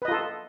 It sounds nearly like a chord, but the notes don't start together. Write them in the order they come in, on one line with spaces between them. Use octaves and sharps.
B4 D#5 F4 A4